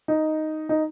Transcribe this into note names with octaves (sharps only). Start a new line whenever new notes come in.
D#4
D#4